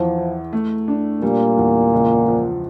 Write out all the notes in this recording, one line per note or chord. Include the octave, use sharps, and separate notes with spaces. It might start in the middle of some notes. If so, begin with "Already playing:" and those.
Already playing: E2 E3 F3
E4
A3
D4
A#2 G3
E2
C#2
F3